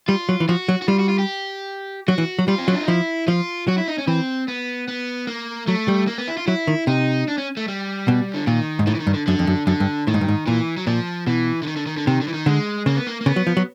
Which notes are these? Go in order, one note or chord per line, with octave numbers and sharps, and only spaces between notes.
G3 F4
F#3
E3
F3 F#4
F#3
F#4
G3 F4
F#4
F4
G4
F#3 F#4
E3
F#3
G3 F4
C4
F#3 C#4
D4
D#4
F3 E4
F3 F4
F#3 F#4
E4
D#4
C#4
E3 C4
B3
B3
A#3
F#3 A3
G3
A#3
B3
E4
F4
F#3 E4
D#3
C3 D#4
D4
C#4
A3
G3
B2
D3
A#2 D#3
G#2
A2 D#3
E3
D#3
G2
D3
F#2 D3
F2
F#2
F#2 D3
G2
A2 D#3
G#2
G2
G#2
A#2 E3
F#3
A#2 F3
B2 E3
D3
D#3
D3
D#3
D3
C3 D#3
D3
E3
D#3
D3 G#3
C#3 A#3
B3
A#3
A#3
C#3 B3
F#3
F3
F#3